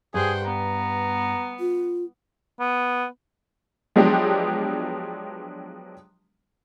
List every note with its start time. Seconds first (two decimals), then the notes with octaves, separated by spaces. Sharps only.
0.14 G2 G#4 C5 F#5 G5
0.46 B3 A#5
1.60 F4
2.60 B3
3.96 F3 F#3 G#3 B3 D4 G4